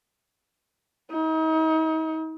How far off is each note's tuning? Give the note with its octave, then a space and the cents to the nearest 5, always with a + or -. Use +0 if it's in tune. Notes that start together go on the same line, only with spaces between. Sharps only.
D#4 +40